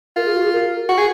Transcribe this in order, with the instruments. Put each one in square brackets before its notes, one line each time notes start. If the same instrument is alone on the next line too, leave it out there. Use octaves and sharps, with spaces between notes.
[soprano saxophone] F4 [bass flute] A#4
[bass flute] G#4
F#4
G#4
A#4
[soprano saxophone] F#4
G#4